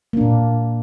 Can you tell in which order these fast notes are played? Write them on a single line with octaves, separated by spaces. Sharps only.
A#3 D4 A#2